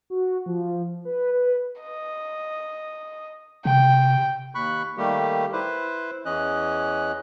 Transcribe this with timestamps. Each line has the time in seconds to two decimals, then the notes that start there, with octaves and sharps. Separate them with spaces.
0.10 F#4
0.46 F3
1.05 B4
1.32 B4
1.81 D#5
3.65 C3 G5
4.55 D#2 B5 C#6 F#6
4.97 D#3 G3 A3 A#3 G4
5.53 E4 B4 C5
6.25 E2 E3 C#4 D#5 F#6